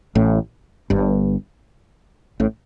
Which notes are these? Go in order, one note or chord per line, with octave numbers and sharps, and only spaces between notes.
A1 A2
G1 G2
A1 A2